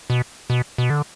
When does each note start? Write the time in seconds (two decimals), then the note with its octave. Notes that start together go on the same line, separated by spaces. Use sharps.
0.10 B2
0.50 B2
0.78 B2
0.90 D3